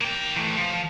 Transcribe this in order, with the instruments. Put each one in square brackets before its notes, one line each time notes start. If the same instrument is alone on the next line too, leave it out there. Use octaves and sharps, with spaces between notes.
[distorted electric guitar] A#3 G5
E3 A3
F3